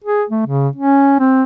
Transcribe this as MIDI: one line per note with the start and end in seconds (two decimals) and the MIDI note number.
0.04 0.24 68
0.29 0.44 57
0.46 0.68 49
0.76 1.15 61
1.19 1.44 60